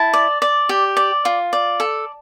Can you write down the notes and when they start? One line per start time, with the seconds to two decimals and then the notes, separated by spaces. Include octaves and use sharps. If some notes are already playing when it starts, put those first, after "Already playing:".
Already playing: E4 A5
0.14 D5
0.42 D5
0.69 G4
0.97 D5
1.25 F4
1.53 D5
1.80 A4